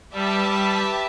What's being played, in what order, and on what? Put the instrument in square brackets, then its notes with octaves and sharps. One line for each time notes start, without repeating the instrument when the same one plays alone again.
[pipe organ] G3 [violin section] G4 B4 E5 A5
[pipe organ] G3